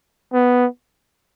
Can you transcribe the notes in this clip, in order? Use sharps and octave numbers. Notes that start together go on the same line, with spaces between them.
B3